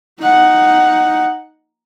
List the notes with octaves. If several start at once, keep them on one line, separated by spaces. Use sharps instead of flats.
D#4 F#5